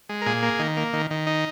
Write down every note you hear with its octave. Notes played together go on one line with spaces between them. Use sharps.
G#3
A#4
A#2 G#4
A#3
D#3
A#3
D#3
D#3
D#4